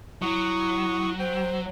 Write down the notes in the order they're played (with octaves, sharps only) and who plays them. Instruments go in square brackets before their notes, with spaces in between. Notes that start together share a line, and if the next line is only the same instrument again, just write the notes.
[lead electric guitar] F#3 [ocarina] E4 [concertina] C#6 D#6
[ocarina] C5 [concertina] G5